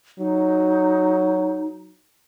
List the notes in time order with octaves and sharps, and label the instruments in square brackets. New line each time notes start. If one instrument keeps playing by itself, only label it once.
[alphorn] F#3 [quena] D#4